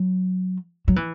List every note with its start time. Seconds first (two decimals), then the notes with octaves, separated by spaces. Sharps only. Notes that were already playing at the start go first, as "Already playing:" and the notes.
Already playing: F#3
0.88 F#3
0.96 E3